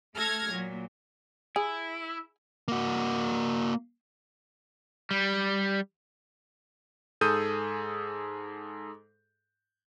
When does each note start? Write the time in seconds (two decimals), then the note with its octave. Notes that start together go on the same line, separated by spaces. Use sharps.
0.16 A3 A4 F6 G#6 A#6
0.51 A#2 F#3
1.56 E4 G#4
2.68 A#3 F#4
5.11 G3
7.21 G#2 G#4 A4 D#6 G6 D#7